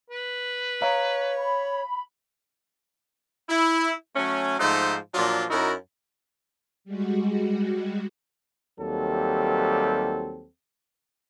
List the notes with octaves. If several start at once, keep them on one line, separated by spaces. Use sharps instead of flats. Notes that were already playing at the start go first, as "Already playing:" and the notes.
B4
C#5 D#5 F5 A#5
B5
E4
F#3 A3 C#4
G#2 F3 A3 D#4 C5
A#2 F3 F#3 D4 F4
F#2 D#4 E4 F#4 A#4
G3 G#3 F#4
D#2 F#3 G3 C4 A4